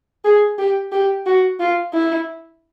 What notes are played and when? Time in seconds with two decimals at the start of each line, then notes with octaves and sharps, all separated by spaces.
0.25 G#4
0.59 G4
0.92 G4
1.26 F#4
1.60 F4
1.93 E4